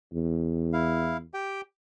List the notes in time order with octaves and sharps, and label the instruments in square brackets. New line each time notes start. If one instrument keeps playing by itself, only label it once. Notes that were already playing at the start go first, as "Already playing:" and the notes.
[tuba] E2
[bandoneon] E4 F5
G4 G5